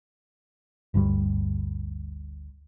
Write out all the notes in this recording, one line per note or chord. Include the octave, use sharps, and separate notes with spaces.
G1 D2 G2 G3